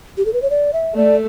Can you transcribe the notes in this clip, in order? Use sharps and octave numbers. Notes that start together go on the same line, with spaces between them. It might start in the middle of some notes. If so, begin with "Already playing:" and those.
G4
A4
B4
C#5
D5
E5
A3 D5